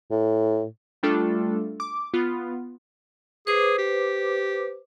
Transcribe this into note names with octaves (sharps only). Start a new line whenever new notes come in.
A2
G3 A3 D4 F4 A4
D6
B3 F4
G#4 B4 C5 D6
G4